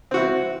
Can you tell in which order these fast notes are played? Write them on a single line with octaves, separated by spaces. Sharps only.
C4 F#4 E4